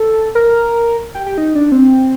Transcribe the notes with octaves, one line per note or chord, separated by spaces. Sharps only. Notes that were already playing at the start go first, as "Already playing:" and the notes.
Already playing: A4
A#4
G4
G4
D#4
D4
C4